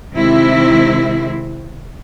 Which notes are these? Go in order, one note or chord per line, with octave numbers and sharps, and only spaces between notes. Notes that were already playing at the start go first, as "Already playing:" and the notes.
C3 D#3 G#3 C4 E4